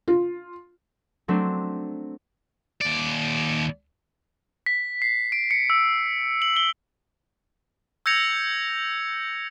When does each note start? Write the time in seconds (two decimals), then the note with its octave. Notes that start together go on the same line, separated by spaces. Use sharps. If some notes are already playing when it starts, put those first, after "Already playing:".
0.08 F4
1.28 F#3 A3 C4 D4
2.81 D#2 D5
4.66 B6
5.02 C7
5.32 D7
5.51 C#7
5.70 E6
6.42 F#7
6.56 G7
8.06 E6 G6 G#6 A#6 C#7 F7